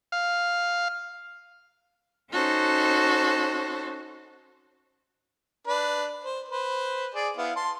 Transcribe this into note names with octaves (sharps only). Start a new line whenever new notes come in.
F5
C#4 D#4 F#4 A4 C5
D4 B4
C5
B4 C5
G#4 D5
B3 E4 F5
A5 C6